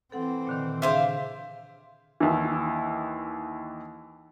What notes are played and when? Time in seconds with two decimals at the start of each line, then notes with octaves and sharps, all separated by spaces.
0.12 E3 C4 A4 F#5
0.47 A#2 D3 D#3
0.82 C#3 D4 G4 G#4 C5 E5 F5
2.20 D#2 E3